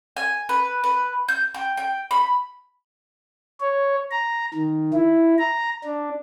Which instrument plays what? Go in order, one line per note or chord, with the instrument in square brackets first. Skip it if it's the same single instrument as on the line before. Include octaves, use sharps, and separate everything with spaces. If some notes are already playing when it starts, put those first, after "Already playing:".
[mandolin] G#5
B4
B4
G6
G5
G5
B5
[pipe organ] C#5
A#5
D#3
E4
A#5
D4